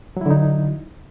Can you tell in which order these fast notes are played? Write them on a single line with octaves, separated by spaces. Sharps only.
F#3 E4 D3 D#4